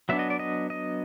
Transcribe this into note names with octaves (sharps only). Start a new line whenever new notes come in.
F#3 B3 D4 E5
D#5
D5
D#5
D#5